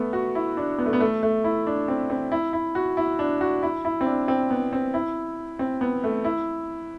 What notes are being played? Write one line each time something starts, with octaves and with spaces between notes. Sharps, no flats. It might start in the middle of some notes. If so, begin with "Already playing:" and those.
Already playing: A3 B3
F#4
E4
D4
B3
A3
B3
A3
A3
E4
D4
C4
C4
E4
E4
F#4
E4
D4
F#4
E4
E4
C4
D4
C4
B3
C4
E4
C4
B3
A3
E4